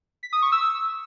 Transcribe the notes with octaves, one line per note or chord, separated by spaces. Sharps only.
B6
D#6
C#6
E6